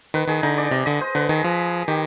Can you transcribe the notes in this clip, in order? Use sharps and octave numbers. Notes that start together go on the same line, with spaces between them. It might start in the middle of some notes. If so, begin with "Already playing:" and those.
D#3 B4
D#3 G#4
D3 D#4
D5
C3 D#5
D3 D#5
C5
D3 B4
D#3 G#4
F3
D#3 G4